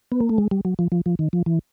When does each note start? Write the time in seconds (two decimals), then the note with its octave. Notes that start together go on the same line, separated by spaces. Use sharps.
0.12 B3
0.21 A#3
0.29 A3
0.38 G#3
0.51 G3
0.65 F#3
0.79 F3
0.92 F3
1.06 F3
1.19 D#3
1.33 F3
1.46 E3